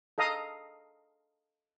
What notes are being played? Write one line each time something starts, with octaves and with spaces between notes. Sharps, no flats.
A4 D#5 F5 A#5 D#6